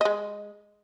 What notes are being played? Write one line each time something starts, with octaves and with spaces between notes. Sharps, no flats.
G#3 D#5